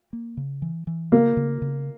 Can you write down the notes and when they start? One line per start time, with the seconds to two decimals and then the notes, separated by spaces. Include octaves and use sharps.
0.13 A#3
0.37 C#3
0.62 E3
0.87 E3
1.12 C#3 A#3
1.37 C#3
1.62 C#3